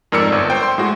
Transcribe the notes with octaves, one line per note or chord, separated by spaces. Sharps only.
F2 G#2 A#4 D5 E6 C#7
G1
C5 G5
C6
A2 G#3 F#4